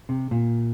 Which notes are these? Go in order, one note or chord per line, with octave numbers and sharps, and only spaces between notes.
C3
A#2